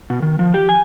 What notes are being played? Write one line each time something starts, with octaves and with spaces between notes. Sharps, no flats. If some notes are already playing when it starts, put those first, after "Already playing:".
B2
D#3
F3
G4
G#5